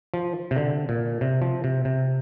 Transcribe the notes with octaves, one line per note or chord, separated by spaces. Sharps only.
F3
C3
D3
A#2
C3
F3
C3
C3